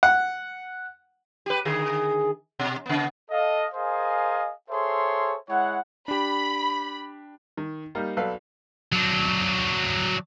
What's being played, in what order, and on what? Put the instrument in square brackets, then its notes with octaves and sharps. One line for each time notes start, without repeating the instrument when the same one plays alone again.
[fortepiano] F#5
[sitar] G4 B4
D3 D#3 G#4
B2
C#3 B3
[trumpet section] A4 D#5 F5
G#4 A#4 C5 D#5 F5 G#5
G#4 A4 C5 C#5 E5 C6
G#3 E4 C#5 F#5
[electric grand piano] D4 G4 [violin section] B5
[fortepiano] D#3
G3 A#3 D#4
B1 A4 B4 D5 F5
[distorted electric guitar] F#3 D4